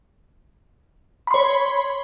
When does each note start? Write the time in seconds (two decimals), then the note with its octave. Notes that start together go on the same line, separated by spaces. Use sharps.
1.27 B5
1.31 C6
1.34 C#5